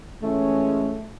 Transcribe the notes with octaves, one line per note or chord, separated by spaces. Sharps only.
E3 G#3 A3 C#4